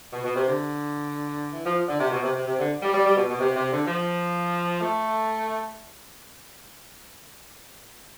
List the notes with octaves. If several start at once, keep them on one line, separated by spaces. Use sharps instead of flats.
B2
B2
C3
D3
E3
F3
D3
C3
B2
C3
C3
C3
D3
G3
G3
G3
B2
B2
C3
C3
D3
F3
A3